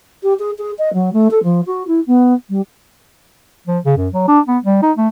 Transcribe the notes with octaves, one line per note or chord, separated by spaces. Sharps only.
G4
G#4
G#4
D#5
F#3
A3
A4
F3
F#4
E4
B3
G3
F3
C#3
F#2
F#3
D4
B3
G3
D#4
A3